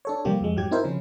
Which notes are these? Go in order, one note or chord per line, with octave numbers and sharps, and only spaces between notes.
D4 A4 C#5
C3 F3 G3 A#3 F4 G4
F2 F3 G#3
G#2 F#3 G4 G#6
C4 D#4 E4 A#4 C5
C#3 F3 C#4